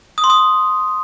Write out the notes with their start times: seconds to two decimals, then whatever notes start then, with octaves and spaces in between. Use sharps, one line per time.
0.18 D#6
0.24 C6
0.30 D#6